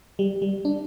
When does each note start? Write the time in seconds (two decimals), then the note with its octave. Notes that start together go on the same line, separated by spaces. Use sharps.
0.19 G3
0.42 G3
0.65 D4